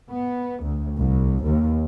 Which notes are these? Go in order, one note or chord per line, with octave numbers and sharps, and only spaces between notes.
B3
D2
C2
D#2